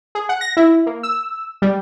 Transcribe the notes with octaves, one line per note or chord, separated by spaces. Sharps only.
G#4
F#5
A#6
E4
A#3
E6
G3